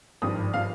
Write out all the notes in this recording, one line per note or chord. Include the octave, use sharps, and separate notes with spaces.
G#1 G2 F3 D#6
F3 F5